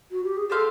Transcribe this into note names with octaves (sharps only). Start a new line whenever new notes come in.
F#4
G4
G#4
D4 G4 A4 C5 F5